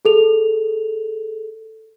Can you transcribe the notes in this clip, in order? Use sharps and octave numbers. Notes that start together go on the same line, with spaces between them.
G#4 A4 F7